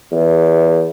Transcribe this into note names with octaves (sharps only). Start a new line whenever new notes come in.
E2